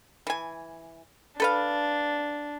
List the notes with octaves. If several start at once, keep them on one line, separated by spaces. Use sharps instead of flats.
E3 G#5
D4 A4 B4 F5